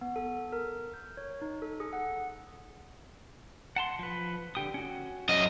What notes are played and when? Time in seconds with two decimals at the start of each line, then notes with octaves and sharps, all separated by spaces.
0.01 B3
0.16 A4
0.52 A#4
0.94 G6
1.17 C#5
1.41 D#4
1.62 A4
1.80 G#4
1.93 F#5
3.76 F#5 A5 C6
3.99 F3 B4
4.55 D3 G4 D#6
4.74 C#4 F#4
5.29 F#2 D#5